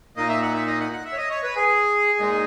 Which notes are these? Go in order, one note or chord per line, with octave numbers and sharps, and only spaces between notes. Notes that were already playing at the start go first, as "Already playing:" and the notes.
A#2 A#3 D#4 D#5
E5
F#5
E5
D#5
F#5
F#5
E5
C#5
D#5
C#5
B4
G#4
A#2 G#3 D#4